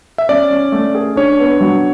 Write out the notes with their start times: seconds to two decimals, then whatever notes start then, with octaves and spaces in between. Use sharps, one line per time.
0.18 E5
0.29 C#4 D5
0.51 C#4
0.72 A3
0.95 G#4
1.16 D4 C#5
1.39 B3
1.61 F#3